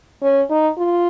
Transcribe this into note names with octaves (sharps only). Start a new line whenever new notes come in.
C#4
D#4
F4